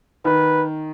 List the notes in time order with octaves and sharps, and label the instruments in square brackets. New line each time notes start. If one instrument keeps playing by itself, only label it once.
[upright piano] D#3 [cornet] B4